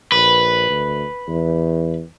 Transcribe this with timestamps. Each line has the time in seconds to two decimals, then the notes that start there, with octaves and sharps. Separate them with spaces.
0.12 A#1 B4
0.70 D2
1.28 E2